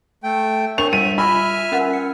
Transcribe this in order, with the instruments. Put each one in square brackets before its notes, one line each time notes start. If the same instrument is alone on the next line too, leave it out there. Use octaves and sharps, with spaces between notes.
[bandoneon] A3 G5
[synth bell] D4 A#4 C#5 [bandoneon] C#6 [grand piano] F7
[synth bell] G3 [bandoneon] E5 [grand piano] D#7
[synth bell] F4 [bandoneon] E5 G#5 F6 [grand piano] B5
[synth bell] C#4 A#4 F#5
C#7